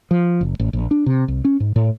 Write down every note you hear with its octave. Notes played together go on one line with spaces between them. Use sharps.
F3
F#1
A1
A#1
D4
C3
C2
C#4
G#2
A2